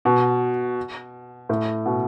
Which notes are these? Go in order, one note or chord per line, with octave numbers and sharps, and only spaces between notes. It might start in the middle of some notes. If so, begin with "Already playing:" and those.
B2
A2
B2